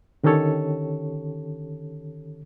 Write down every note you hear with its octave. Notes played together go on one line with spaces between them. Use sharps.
D3 D#3 C#4 G4 A4 C#5